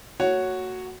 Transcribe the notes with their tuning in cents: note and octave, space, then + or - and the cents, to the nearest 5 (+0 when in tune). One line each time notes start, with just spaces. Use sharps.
A#3 -45 F#4 +0 C#5 +0